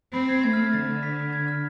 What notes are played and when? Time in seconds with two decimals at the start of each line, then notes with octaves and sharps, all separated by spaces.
0.13 C4 B5
0.28 G#6
0.43 A3 G#6
0.53 F6
0.63 G#6
0.73 D3 A6
1.03 B6
1.33 G#6
1.48 F6